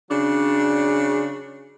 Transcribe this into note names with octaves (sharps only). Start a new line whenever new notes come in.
C#3 F#3 D4